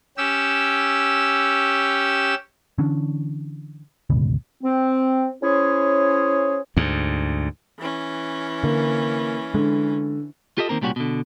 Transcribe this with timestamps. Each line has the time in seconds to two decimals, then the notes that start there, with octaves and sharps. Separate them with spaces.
0.18 C#4 G4 E6
2.78 D3 E3 C#4 D4
4.10 D1 G1 C#2 B2
4.63 C4
5.42 C#4 E4 G#4 C5 C#5
6.77 D2 G#2
7.79 E3 C#4
8.64 D3 A#3
9.54 D3 G#3
10.58 F4 G4 A4 D#5
10.69 D#3 A#3 C4 A#4
10.81 C2 A#2 G3 C#4 F#4
10.96 B2 D3